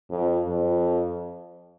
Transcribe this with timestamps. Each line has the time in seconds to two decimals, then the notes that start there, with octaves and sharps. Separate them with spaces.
0.11 F2
0.48 F2